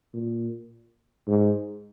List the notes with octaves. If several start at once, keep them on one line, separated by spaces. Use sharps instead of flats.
A#2
G#2